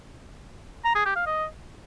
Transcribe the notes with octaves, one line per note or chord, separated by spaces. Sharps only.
A#5
G#4
G4
F5
D#5